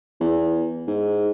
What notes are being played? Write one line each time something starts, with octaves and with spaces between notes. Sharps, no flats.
E2
G#2